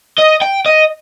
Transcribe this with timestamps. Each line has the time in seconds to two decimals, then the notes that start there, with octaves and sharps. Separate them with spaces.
0.18 D#5
0.41 G5
0.66 D#5